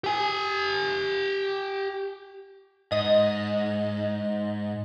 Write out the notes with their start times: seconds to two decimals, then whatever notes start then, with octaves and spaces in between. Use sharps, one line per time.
0.04 G4 G#5
2.92 G#2 D#5